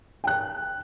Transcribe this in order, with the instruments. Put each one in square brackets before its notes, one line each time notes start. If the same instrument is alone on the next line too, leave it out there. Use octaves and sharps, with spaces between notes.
[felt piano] G5 F#6